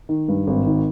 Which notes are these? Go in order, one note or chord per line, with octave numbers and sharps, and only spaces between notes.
D#3
G2
G#1
D#3